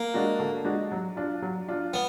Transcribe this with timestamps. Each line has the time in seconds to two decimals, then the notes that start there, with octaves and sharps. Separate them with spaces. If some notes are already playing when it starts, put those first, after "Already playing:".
Already playing: A#3
0.14 G#3 D4 F#4
0.40 D3
0.65 G#3 D4 F#4
0.92 F#3
1.17 D4 F4
1.42 F#3
1.69 D4 F4
1.94 B3